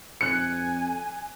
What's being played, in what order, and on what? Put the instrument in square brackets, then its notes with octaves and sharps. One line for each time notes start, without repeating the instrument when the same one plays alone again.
[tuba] F2 [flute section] G#5 [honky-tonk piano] F#6 C#7